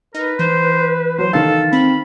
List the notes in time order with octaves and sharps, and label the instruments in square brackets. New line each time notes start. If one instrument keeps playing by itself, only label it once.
[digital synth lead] D#4 [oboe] A#4 [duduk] B4
[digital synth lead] E3 [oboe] C5
[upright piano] F#3 [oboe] C5
[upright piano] D#3 F5 [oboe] A4
[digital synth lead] C4 [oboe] B5